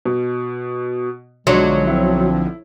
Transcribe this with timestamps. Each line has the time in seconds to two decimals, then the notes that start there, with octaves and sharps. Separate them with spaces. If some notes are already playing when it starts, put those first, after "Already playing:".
0.05 B2
1.47 B1 D3 F3 F#3 G#3 D4 C6
1.87 C4 E4